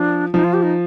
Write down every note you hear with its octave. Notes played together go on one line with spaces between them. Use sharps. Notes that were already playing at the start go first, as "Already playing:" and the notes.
Already playing: F3 D4
F3 D#4
F4
G4
D#4